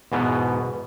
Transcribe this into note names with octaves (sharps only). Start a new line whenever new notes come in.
E2 G#2 B2 B3